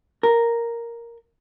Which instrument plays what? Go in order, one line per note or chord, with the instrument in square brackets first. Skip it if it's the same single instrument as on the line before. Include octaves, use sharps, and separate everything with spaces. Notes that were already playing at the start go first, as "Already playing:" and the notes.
[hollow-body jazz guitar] A#4